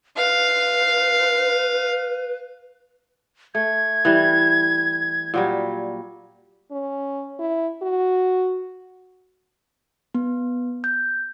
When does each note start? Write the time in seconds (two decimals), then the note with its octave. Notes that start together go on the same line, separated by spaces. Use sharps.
0.17 B4 F5
3.55 A3 G#6
4.05 E3 G3
5.34 A#2 F#3 G3
6.71 C#4
7.39 E4
7.82 F#4
10.15 B3
10.84 G6